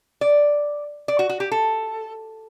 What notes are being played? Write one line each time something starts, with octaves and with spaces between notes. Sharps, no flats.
D5
D5
F#4
F#4
G4
A4